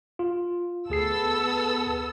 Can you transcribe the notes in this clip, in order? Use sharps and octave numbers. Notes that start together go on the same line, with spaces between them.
F4
D2 B3 G#4 A4 E6 C7